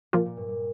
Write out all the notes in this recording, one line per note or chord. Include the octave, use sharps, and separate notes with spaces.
A#2 F3 A#3 F4
A#2
G2
G2